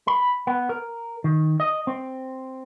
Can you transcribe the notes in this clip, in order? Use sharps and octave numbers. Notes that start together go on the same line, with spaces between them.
B5
B3
A#4
D#3
D#5
C4